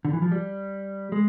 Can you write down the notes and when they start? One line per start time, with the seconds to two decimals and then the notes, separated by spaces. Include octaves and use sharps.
0.05 D3
0.13 E3
0.22 F3
0.31 G3
1.12 G#3